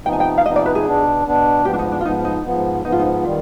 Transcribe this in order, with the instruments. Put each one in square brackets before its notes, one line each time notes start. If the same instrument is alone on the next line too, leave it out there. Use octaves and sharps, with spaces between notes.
[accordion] C3 F3 B3 D#4 [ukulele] G5
[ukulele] G#5
G5
F5
[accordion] C3 F3 B3 D#4 [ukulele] D#5
[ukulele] D5
B4
G#4
[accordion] B2 B3 D4
B2 B3 D4
[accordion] G#2 F3 B3 [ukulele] G4
[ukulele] D4
D#4
D4
F4
[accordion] G#2 F3 B3 [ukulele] D#4
[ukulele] D#4
[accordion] G#2 F3 B3
[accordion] G#2 F3 B3 [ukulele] D#4
[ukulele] F4
D#4
[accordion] D#3 G3 [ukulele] F4